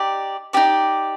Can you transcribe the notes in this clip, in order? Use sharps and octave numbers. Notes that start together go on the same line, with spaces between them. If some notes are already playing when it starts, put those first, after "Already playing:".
Already playing: D#4 G4 D5
D#4 G4 D5